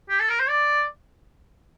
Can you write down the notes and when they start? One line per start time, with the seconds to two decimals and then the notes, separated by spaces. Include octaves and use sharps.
0.09 G4
0.20 A4
0.29 A#4
0.40 C5
0.49 D5